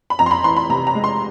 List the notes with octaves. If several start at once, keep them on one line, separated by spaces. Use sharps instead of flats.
B5
F2 A#5
C6
B5
E3 C6
B5
C3 A#5
A#5
G#3
C6